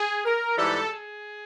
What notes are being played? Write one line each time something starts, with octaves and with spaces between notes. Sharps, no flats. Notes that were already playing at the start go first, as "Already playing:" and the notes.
Already playing: G#4
A#4
G#2 E3 G3 A4
G#4